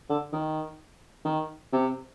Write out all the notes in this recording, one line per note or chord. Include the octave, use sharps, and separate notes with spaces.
D3
D#3
D#3
C3